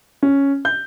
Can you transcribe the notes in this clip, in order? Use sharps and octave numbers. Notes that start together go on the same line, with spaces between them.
C#4
G6